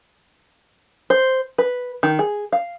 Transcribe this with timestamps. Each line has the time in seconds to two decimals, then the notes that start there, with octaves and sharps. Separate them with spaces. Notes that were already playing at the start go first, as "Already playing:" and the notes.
1.10 C5
1.58 B4
2.03 D#3
2.19 G#4
2.52 F5